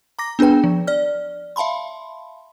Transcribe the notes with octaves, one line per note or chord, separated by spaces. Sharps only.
A#5 D6 A#6
B3 D4 G#4 B4 G5
F3
D5 F6
E5 F5 A5 B5 C6